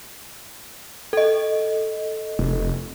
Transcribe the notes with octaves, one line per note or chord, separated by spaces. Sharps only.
A4 D#5
F1